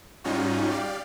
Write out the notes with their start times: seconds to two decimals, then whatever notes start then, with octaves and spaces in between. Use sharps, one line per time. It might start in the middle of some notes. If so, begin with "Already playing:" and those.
0.24 G#2 G3 C#4 D#4 F4 F#4
0.70 G4 D5 F5